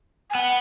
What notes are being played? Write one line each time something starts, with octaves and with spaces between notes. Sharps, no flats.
G#5
B3 F#5